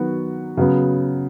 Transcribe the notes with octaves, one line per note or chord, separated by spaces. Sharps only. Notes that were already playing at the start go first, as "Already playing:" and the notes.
Already playing: D#3 F#3 B3 F#4
C#3 F#3 B3